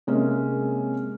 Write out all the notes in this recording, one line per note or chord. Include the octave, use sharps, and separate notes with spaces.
C3 G#3 A#3 C#4